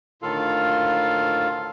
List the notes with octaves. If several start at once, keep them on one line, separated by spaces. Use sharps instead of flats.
D2 A2 D#3 F4 A4 F5